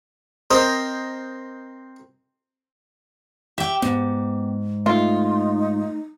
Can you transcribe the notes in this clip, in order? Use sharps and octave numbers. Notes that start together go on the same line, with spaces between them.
C4 A#4 C5 D#5
G4 E5 G5
G#2 B3
A3 D#4 F4